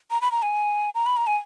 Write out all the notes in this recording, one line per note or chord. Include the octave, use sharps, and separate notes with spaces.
A#5
B5
A#5
G#5
A#5
B5
A#5
G#5